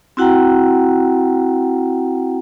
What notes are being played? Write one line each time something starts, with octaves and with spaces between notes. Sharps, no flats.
C4 E4 F#4 F#5 G5 A#5